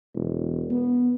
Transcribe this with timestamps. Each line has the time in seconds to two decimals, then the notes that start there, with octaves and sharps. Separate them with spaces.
0.15 E1
0.71 B3